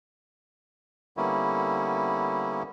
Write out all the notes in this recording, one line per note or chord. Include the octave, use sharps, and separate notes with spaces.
D3 G3 A#3 B3 C#4 E4